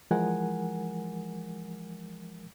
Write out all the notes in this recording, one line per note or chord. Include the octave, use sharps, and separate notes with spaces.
E3 F3 G#3 A#4 F#5 G#5